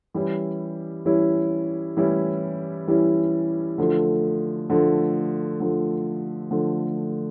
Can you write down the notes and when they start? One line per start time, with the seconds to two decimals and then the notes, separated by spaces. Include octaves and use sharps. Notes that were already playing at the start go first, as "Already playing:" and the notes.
0.14 E3 G3 C#4 E4
1.05 E3 G3 C#4 E4
1.97 E3 G3 C#4 E4
2.88 E3 G3 C#4 E4
3.78 D3 F3 A3
4.70 D3 F3 A3
5.60 D3 F3 A3
6.51 D3 F3 A3